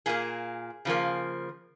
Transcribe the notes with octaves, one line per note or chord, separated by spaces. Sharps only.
A#2 A#3 G#4
C#3 F3 A#3